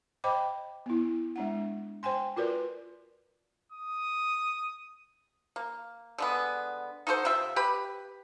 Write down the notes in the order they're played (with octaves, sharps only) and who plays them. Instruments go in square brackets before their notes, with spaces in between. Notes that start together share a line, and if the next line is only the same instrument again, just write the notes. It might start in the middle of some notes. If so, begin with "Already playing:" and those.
[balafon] C5 D#5 G5 B5 D6
B3 E4
G#3 D4 F#5
C5 G5 G#5 C6
F4 F#4 A#4 B4 D5
[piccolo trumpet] D#6
[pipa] A#3
D3 G#3 B3
D#4 F#4 A4 C5
C3 F4 E5
G4 B4 B5